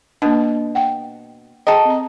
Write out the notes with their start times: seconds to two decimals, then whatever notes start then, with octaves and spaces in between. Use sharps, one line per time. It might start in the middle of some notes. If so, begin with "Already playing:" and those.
0.22 B2 A#3 D4
0.75 F#5 G5
1.67 G#4 A4 D#5 G5 A#5
1.85 C4 A#5